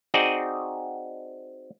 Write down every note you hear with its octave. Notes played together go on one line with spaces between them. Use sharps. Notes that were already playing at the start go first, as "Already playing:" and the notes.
C4 D#4 F#4 G#4 D5 D#5